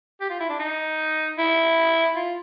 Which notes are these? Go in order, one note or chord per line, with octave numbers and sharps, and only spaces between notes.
G4
F4
E4
D4
D#4
E4
F4